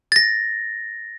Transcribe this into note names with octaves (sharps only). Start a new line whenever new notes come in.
A6 A#6